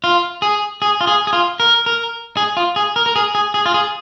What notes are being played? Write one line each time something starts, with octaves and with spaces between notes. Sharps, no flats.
F4
G#4
G#4
F4
G#4
G#4
F4
A#4
A#4
G#4
F4
G#4
A#4
A#4
G#4
G#4
G#4
F4
G#4